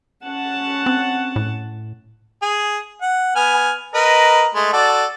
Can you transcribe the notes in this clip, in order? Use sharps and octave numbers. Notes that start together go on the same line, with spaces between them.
C#4 F#5 A5
C4
A2
G#4
F#5
B3 G#5 F6
A#4 B4 D#5
G#3 A3
F#4 A4 D5